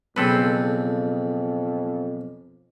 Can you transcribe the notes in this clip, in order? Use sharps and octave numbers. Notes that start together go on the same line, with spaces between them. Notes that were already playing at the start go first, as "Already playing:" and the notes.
B1 F2 C#3 C4 A4 B4